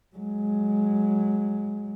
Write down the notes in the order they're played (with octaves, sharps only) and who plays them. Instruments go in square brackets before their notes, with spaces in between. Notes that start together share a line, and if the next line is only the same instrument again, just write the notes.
[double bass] F#3 G#3